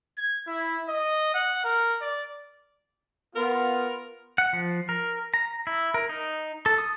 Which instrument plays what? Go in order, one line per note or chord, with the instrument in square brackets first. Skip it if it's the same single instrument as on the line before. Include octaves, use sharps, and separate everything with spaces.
[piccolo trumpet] G#6
E4
D#5
F#5
A#4
D5
[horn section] B3 F4 [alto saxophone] A#4
[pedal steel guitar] F#5
F3
A#4
A#5
E4
A#4
D#4
A4
D#6